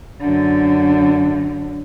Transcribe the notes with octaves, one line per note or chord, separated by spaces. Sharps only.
F#2 D3